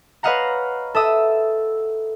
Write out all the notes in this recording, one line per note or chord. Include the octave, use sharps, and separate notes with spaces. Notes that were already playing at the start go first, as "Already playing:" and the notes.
B4 C#5 D#5 F5 F#5 A#5
A4 E5 D#6 E6